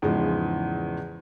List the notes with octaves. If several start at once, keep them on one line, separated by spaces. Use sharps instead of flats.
E2 G#2 C#3 E3 F3 G#3